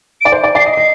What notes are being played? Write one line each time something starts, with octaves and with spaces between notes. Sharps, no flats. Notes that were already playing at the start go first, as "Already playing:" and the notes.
D5 D7
C5
D5
D5 C7
D#5
C7
D#5